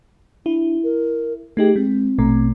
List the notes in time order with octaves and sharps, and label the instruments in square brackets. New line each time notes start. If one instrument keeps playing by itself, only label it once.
[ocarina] D4 [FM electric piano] E4
[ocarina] A#4
[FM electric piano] A3 D#4 G4 [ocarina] G#4
[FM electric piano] G#3 [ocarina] C4
[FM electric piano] A#1 B2 A3